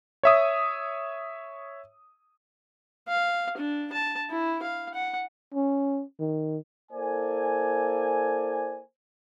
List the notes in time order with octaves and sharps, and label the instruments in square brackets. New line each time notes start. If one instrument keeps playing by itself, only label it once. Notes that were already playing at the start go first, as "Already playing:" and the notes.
[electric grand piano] C#5 E5 D#6
[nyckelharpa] F5
D4
A5
E4
F5
F#5
[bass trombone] C#4
D#3
[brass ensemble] A#3 E4 A4 C5 D5 G#5